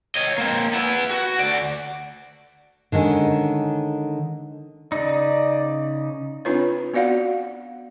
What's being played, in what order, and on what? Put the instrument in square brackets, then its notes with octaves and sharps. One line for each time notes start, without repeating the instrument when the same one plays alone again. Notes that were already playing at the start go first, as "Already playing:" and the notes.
[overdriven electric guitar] C#5 D#5
A#3 C4
B3 E4
F#4
D2 D5
[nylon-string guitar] D3 D#3 G#3 C4 C#4
[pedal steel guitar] C#3 D#4 [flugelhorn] D5
[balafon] C4 D4 D#4 F4 B4 C#5
B3 F#4 D5 F5 F#5